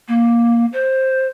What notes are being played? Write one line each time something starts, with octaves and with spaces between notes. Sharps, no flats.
A#3
C5